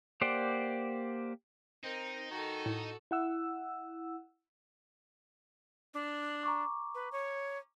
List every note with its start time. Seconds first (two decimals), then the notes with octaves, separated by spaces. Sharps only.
0.21 A#3 G4 C5 D5 F#5
1.84 C4 D#4 A#4
2.31 D#3 F#4 A4
2.66 A2
3.11 E4 F#5 E6
5.94 D4
6.43 A#5 C#6 D6
6.95 B4
7.12 C#5